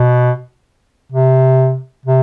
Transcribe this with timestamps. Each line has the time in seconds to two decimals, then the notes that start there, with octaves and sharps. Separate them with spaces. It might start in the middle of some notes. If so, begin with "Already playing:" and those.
Already playing: B2
1.12 C3
2.06 C3